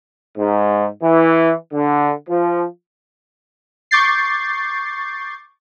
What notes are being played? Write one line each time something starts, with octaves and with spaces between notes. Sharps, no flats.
G#2
E3
D3
F3
C#6 D6 G6 A6 C7